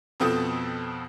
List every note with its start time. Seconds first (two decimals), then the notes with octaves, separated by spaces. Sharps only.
0.20 F2 B2 F3 C4 A4 D#6